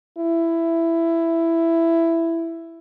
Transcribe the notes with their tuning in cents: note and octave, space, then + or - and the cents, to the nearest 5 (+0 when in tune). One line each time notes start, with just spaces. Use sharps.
E4 +10